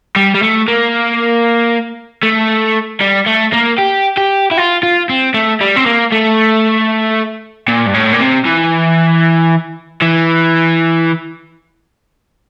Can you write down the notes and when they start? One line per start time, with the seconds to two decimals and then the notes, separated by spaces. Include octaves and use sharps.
0.16 G3
0.35 G3
0.43 A3
0.68 A#3
2.23 A3
3.01 G3
3.27 A3
3.53 A#3
3.79 G4
4.18 G4
4.51 E4
4.57 F4
4.83 F4
5.09 C4
5.34 A3
5.61 G3
5.77 C4
5.86 A#3
6.12 A3
7.68 A#2
7.86 G2
7.94 A2
8.13 A#2
8.20 C3
8.45 E3
10.01 E3